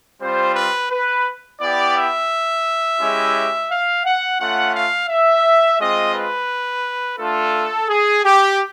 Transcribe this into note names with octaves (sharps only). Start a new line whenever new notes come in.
G3 C4 F4 C5
B4
B4
B3 E4 G4 D5
E5
G#3 C#4 E4 G4
F5
F#5
A3 C#4 F4 F#5
F5
E5
G#3 C4 F4 D#5
B4
A3 D4 F4 A4
G#4
G4